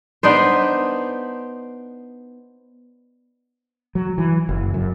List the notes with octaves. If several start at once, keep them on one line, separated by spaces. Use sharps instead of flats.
B3 D4 D#4 C5
F#3
E3
F#1
F#2